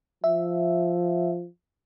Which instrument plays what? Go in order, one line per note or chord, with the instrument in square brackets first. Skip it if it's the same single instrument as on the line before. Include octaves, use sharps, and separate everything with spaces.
[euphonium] F3 [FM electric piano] E5